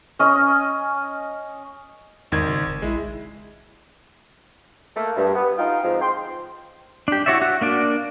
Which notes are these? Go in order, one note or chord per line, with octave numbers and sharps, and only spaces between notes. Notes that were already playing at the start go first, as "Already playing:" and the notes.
C#4 D#5
G#1 E2 D#3 G#6
C#3
F1
A#1 G#3 E4
A3 A#3
G2
B3
D#4 F4 F5 G5
G#2 F3 G#3 C4
G5 C6
D4 G4
E4 F#4 C#5 D5 E5
F#4
A#3 D4 D5